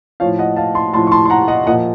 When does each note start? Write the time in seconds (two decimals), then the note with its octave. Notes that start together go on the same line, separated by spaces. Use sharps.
0.20 F3 C#5 F5
0.24 A2
0.39 D#5 F#5
0.56 F5 A5
0.75 A5 C6
0.93 A2 A5 C6
0.97 F3
1.07 C#6
1.12 A5 C6
1.26 C6
1.30 F#5 A#5
1.48 D#5 F#5
1.67 A#2 F3 D#5 F#5